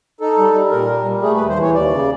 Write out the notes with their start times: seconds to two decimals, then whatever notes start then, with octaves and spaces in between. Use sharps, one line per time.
0.21 D#4 A4
0.38 G3
0.54 G3
0.71 A#2 A#4
0.89 G3
1.05 G3
1.22 A3 G#4
1.35 B4
1.40 D#2
1.49 C5
1.57 E3 C#5
1.75 D#2 D5
1.91 C#3